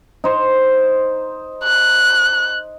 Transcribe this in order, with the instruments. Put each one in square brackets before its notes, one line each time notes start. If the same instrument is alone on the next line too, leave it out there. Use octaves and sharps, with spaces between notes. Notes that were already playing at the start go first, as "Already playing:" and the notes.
[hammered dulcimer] D#4 C5
[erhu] F#6